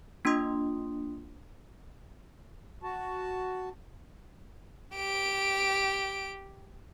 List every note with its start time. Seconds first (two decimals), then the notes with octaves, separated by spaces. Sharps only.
0.25 A#3 D4 F4 C6 D#6
2.83 F#4 A5
4.95 G4 D7